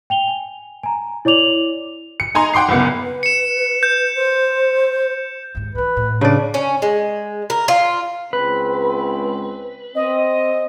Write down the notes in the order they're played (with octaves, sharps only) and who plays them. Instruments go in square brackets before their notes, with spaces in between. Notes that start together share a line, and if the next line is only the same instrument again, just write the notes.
[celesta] G5 F7 G7
G#5
G#5 A#5
E4 C#5 D5 D6 F7 F#7
[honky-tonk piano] C#7
D#4 G#5 A#5 C6
F#5 G5 C6 D6 C7
F#1 C2 B3 C#7
[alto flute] B4
[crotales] C#7 E7
G6
[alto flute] C5
[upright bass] D#2 G#2
[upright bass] D3 E3 [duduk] B4
[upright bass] A2
[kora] C#3 D5 [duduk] D4
[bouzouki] C#4
G#3
A#4
F4
[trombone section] C#2 C4 [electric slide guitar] B4
[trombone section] C4 [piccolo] D#5